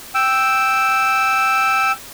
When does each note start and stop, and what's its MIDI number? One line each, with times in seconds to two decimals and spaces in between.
0.15 1.92 79
0.15 1.92 88